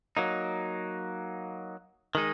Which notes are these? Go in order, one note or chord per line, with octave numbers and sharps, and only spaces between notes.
F#3 A#3 D#4
D#3 G#3 D#4